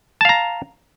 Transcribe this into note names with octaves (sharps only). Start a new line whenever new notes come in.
F5 A5 A#5